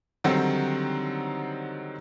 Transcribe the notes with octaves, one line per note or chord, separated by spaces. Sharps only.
D3 D#3 F#3 G3 C4 D#4